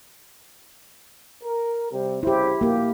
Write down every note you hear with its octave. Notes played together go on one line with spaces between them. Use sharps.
A#4
C3 G3 C4
C2 C#3 E4 G4 C5
D2 B2 F3 A#3 G4